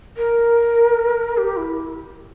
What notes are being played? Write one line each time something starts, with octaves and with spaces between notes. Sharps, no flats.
A#4
G4
E4